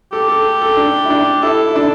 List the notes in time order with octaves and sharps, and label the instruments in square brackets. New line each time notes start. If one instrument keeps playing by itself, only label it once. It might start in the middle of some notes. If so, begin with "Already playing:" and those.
[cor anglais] G4 [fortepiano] A4
[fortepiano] A4
A4
D4
E4
D4
[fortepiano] E4 [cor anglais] A4
[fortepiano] E4
D4